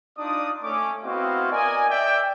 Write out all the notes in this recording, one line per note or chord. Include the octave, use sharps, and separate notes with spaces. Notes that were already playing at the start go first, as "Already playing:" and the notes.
D4 D#4 F4 D5 D#6
A3 C#4 D6
B3 C4 E4 F#4 D#5 F5
A#4 D5 D#5 G#5
D5 E5 G5